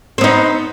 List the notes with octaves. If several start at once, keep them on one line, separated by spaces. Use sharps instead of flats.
B3 C4 D#4